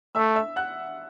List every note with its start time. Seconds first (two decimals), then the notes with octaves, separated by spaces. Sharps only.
0.15 A3 E5 E6
0.36 E5 E6
0.56 F#5 F#6